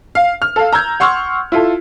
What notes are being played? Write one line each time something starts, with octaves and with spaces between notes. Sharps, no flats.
F5
F6
A4 F5
A#5 E6 G6 G#6
F#5 C6 C#6 E6 F6
E4 F4 A4